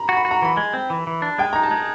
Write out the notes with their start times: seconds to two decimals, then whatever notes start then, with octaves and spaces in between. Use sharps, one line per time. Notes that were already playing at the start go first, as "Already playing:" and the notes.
Already playing: A#5 B5
0.09 F#4
0.17 B5
0.25 F#4
0.31 A#5
0.42 E3 B5
0.57 G#3
0.74 C4
0.90 E3
1.07 E3
1.22 D4
1.38 G#3 G5
1.53 D#4 A#5
1.63 A5
1.71 G#3